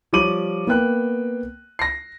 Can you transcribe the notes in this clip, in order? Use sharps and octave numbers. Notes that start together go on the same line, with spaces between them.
F3 G3 C#5 D6 D#7 F#7
A#3 B3 G5 F#6
A#6 C7